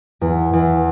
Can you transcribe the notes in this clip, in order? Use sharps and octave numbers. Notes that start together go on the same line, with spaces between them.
E2
E2